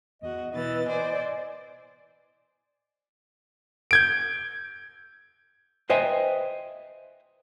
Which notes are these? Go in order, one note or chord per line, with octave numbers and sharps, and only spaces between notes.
E2 F#4 D#5
B2 E3 D#5 A6
C5 D5 G#5
G6 G#6 D7
B4 C5 D#5 E5 G5 G#5